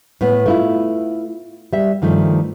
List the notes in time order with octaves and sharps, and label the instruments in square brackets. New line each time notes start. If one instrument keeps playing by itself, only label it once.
[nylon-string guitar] A2 B3
A3 E4 F4
G3 E5
G2 D#3 F3 A3